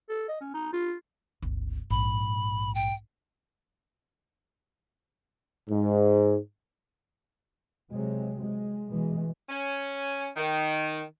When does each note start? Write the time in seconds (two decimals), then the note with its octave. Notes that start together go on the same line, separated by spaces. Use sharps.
0.09 A4
0.29 D#5
0.41 C#4
0.54 D#4
0.73 F4
1.42 G1 C#2
1.91 A#1 G#2 B5
2.75 G5
5.69 G#2
7.91 C3 F#3 G#3
8.42 G#3
8.91 B2 E3 G#3
9.49 C#4
10.37 D#3